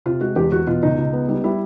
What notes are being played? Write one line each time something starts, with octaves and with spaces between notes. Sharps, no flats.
C3 F4
G#3 F#4
E2 G4
E2 F#4
B2 F4
C#2 D#4
C#2
B3
G3 D#4
G3 E4